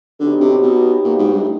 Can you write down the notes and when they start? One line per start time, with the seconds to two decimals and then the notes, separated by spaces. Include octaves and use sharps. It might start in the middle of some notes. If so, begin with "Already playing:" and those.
0.20 D3 F#3 B3 D#4 G4
0.41 C3
0.63 B2
1.04 A#2
1.19 G#2
1.33 G2
1.42 A2